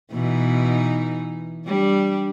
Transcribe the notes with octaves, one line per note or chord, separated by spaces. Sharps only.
B2 E3 D#4
G3 D4